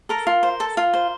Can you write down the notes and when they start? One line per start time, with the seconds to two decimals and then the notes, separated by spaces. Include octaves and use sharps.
0.09 A4 A#4 A#5
0.27 F4
0.43 C5
0.60 A4
0.77 F4
0.94 C5